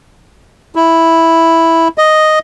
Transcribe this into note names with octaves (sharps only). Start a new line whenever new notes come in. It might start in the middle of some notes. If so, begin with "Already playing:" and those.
E4
D#5